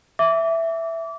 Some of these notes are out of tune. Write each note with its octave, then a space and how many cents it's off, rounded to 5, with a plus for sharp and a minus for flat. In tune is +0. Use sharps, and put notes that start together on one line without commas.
E5 +0 D6 -25